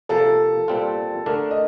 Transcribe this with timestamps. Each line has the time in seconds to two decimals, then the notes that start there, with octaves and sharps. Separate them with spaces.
0.09 C3 F3 A#3 A4
0.68 A#2 G3 C4 F4
1.26 D3 A3 D4 A#4
1.51 D#5